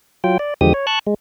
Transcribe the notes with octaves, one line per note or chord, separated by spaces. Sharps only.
F#3 F4 G5
D5
E2 D3 F3 G#3 G4 D#6
C#5
A5 C#6 F#6
G#3